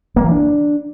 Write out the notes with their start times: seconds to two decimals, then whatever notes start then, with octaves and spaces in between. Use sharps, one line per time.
0.16 A#3
0.24 E3
0.31 D4